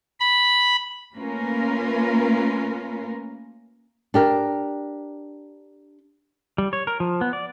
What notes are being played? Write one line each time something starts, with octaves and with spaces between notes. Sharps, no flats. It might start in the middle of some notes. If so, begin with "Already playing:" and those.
B5
A3 A#3 C#4 F4 A#4 B4
D4 G4 A#4
G3
C#5
A#4
F3
B3
D5